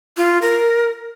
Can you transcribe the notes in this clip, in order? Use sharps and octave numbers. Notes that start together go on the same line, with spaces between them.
F4
A#4